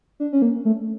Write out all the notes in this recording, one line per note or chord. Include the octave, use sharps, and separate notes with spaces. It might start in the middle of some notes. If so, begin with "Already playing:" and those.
D4
C#4
A#3
A3